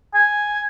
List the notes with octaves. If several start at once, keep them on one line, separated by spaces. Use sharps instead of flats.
G#5